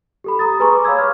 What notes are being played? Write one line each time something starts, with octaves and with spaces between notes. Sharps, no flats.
G4 A4 B5
A#5 D#6 A6
G#4 B4 G#5 A#5 C6 C#6
D6
C#5 F5 B5 E6 G#6
F6